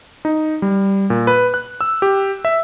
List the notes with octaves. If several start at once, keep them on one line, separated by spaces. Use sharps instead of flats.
D#4
G3
A#2
B4
F#6
E6
G4
E5